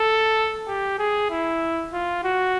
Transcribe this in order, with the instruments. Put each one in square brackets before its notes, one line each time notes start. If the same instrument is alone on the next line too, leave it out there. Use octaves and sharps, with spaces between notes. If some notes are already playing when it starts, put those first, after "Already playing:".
Already playing: [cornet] A4
G4
G#4
E4
F4
F#4